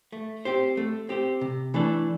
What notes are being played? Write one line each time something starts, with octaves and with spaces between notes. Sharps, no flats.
A3
C4 G4 C5
A3
C4 G4 C5
C3
E3 A3 D4 A4